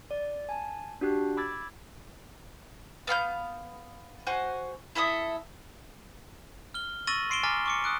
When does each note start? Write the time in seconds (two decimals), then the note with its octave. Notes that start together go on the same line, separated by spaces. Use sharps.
0.11 D5
0.49 G#5 A5
1.01 D4 F#4 G4 F#6
1.37 B5 D6 E6 G#6 A6
3.07 B3 F5 C6 G6
4.27 F#4 C5 F#5 G#5
4.95 E4 A4 E5 D#6
6.74 F6 G7
7.07 C#6 E6 A6 A#6 D#7 F#7
7.30 C6 C7 D7 E7 G7
7.43 G#5 A#5 D6 F6 A6 B6
7.66 C#6 D6 C#7
7.84 D#6 F#6 D7